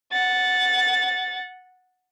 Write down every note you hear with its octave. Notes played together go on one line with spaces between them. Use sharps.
F#5 A6